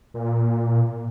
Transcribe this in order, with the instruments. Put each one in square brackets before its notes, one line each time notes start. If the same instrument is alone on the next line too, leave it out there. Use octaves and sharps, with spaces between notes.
[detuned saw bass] A#2